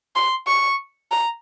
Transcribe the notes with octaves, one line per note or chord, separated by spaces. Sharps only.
C6
C#6
A#5